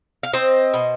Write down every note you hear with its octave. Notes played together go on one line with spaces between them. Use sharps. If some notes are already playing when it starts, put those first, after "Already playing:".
F5
C4 C5 D#5
B2